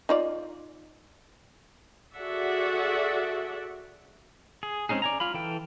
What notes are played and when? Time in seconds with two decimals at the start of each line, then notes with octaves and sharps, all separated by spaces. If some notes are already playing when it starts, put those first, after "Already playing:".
0.09 D#4 F4 D5
2.14 F#4 G#4 A4 D5 E5 F#5
4.63 G#4
4.89 G#3 C4 C#4 D#4 G#4
5.02 D5 G#5 A#5
5.20 F4 F5 B5
5.34 E3 A4 G5